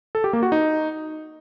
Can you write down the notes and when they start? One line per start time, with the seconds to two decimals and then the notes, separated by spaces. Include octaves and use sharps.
0.15 A4
0.24 G4
0.33 A#3
0.43 F#4
0.52 D#4